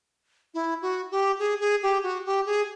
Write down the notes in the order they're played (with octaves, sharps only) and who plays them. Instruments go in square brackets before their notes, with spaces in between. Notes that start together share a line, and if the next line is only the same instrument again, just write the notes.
[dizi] E4
F#4
G4
G#4
G#4
G4
F#4
G4
G#4